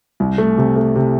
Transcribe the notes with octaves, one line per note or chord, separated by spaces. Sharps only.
C2
A3
C3
A3
C3